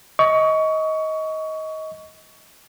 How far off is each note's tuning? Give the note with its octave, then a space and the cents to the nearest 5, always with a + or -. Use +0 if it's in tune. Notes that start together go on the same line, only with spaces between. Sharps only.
D#5 +20 C#6 +20